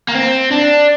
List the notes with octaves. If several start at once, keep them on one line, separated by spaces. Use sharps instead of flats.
A#3
C4
D4